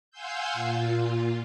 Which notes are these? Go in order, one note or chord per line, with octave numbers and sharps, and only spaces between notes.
F5 F#5 G#5 C6 E6 G6
A#2 F4